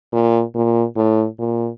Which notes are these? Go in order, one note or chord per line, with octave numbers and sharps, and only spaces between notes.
A#2
A#2
A2
A#2